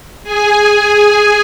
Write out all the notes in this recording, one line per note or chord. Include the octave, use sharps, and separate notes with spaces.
G#4 G#5